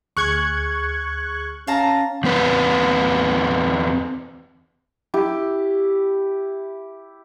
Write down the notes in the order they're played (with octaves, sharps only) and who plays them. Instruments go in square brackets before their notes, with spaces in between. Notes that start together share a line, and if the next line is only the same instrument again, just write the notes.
[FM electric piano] D2 G#4 F6 [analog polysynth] C#6 F#6 G#6
[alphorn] C#4 [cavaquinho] F5 A5 A#5
[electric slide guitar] E2 C4 B4
[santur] E4 G4